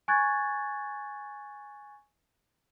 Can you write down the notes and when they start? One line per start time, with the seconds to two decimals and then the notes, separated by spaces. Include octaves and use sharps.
0.08 G#5 C#6 F#6 G#6 A6